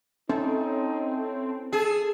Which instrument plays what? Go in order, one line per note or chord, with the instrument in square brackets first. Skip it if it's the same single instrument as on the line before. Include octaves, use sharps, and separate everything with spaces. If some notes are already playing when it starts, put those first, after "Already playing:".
[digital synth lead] C4 [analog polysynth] C#4 E4 A4 [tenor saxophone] D#4
[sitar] G#4 [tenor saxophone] A4